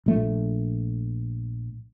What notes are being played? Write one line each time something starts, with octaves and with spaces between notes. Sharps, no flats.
A#1 A3